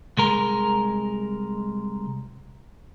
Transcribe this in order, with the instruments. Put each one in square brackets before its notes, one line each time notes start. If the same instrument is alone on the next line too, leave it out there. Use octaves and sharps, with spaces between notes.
[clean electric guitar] C2 G#3 A#4